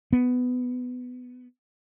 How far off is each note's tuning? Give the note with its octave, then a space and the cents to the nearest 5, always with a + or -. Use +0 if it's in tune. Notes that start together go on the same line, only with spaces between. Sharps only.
B3 +15